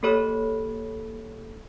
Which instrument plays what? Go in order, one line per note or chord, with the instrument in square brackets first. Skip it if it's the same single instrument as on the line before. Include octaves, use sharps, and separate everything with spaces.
[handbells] A#3 G4 A4 C#5 B5 F6